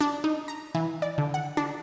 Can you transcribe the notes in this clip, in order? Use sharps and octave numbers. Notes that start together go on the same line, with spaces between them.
D4
D#4
A#5
E3
D5
D3
F#5
D4